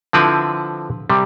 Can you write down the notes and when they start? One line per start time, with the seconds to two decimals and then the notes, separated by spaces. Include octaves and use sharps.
0.13 D3 F3 C4 E4 B4
1.10 C3 G3